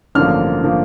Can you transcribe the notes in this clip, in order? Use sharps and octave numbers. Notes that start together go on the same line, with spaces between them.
A1 G2 D3 F3 A#3 F6
D3 F3 A#3